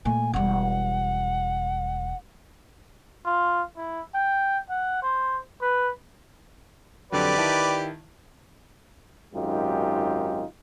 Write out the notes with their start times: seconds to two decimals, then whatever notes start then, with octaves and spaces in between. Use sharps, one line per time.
0.05 A#2 A3 G#5
0.34 E1 G3 F#5
3.25 F4
3.77 E4
4.14 G5
4.69 F#5
5.03 C5
5.61 B4
7.12 F2 D3 F#3 G4 B4 D5
7.38 D#3 E4 A5
9.33 G#1 F#2 G#3 D#4 F4 G4